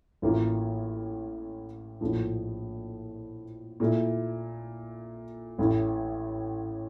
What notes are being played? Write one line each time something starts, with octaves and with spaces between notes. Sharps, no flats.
A1 A2 E3 A#3 F4
A#1 A2 F3
A#2 A3 E4
A1 A2 E3